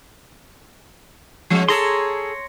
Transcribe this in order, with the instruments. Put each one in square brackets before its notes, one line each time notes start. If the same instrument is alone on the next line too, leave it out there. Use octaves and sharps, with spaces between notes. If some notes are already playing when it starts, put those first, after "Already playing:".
[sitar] F3 G#3 C#4
[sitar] G#4 A4 [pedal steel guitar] C#5 A#5 C6